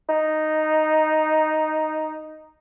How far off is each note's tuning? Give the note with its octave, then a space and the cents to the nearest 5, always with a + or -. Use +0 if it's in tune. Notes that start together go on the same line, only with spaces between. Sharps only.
D#4 -5